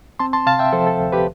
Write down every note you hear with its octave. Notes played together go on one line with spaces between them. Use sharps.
C4 A5 C6
A5 C6
C3 F5 A5
E5 G5
F3 A4 C5
A4
D2
G4 B4